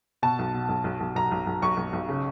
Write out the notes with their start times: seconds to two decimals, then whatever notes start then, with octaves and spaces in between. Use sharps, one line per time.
0.23 B2 A5
0.39 B1
0.54 B2
0.69 B1
0.84 B1
1.00 B1
1.15 B1 A#5
1.31 B1
1.47 B1
1.62 B1 C#6
1.77 B1
1.93 B1
2.09 C#3